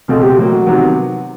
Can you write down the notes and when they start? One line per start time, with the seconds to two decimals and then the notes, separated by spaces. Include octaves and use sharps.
0.08 C#2 B2 G#3 C4 A4
0.23 G4
0.36 A2 F#3 A#3 F#4
0.66 C3 D#3 F#3 B3